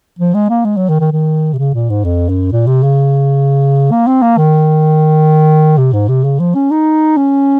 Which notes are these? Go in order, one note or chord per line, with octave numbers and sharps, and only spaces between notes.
F3
G#3
A#3
G#3
F#3
D#3
D#3
D#3
C3
C#3
A#2
G#2
F2
F#2
A#2
C3
C#3
A#3
C4
A#3
D#3
C3
G#2
C3
C#3
F3
C#4
D#4
C#4